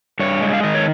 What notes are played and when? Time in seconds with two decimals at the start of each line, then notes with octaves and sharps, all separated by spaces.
0.19 G2 C#5
0.41 G#3
0.53 F5
0.63 D#3 D#5
0.75 C#5